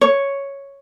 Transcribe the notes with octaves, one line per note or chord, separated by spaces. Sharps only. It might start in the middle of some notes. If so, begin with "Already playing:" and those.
C#5